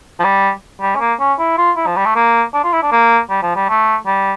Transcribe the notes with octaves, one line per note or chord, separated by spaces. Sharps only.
F3
G3
G3
C#4
A#3
C#4
E4
F4
E4
F3
G3
A3
A#3
D4
F4
E4
D4
A#3
G3
F3
G3
A3
G3